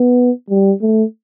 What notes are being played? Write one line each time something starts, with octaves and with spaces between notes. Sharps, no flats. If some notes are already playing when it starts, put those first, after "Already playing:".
Already playing: B3
G3
A3